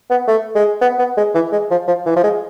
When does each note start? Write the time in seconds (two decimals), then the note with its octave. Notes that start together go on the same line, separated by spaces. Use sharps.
0.11 B3
0.28 A3
0.55 G#3
0.81 B3
0.99 B3
1.17 G#3
1.35 E3
1.52 G#3
1.71 F3
1.88 F3
2.06 E3
2.16 F3
2.23 G#3